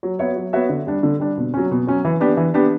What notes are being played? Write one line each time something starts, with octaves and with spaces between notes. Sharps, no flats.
F#3
B3 F#4 C#5 E5
F#3
B3 F#4 C#5 E5
D3
G3 D4
D3
G3 D4
B2
F#3 C#4
B2
F#3 C#4
E3
B3 D4 G4
E3
B3 D4 G4